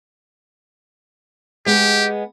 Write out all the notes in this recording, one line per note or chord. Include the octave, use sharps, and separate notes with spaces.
G#3 B3 G4 G#4